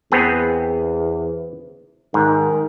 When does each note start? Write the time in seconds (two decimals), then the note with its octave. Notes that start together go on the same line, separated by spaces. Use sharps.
0.12 E2 B3 C4 G#4
2.14 G#2 D#3